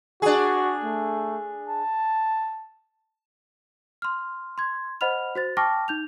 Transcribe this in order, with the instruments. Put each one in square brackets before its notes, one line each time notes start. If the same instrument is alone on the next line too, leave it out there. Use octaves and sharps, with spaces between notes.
[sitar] D4 G#4 [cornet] F#4
[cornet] A3
A5
[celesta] C6 F6
C6 G#6
C5 D#5 F#5 B5 F6 F7
F#4 C5 A6
G5 A5 C#6 D6 F6 A#6
D#4 G6 F7